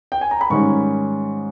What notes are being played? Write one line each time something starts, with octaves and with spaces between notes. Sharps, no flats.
G5
G#5
A#5
B5
G#2 D#3 G3 C#4 C#6